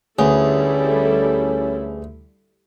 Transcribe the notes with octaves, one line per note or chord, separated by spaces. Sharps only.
D2 G3 C#4 E4 G#4 A4 B4